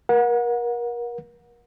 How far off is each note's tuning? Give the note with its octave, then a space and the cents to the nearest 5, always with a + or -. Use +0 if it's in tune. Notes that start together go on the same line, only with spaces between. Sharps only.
A#4 +35 F#5 -30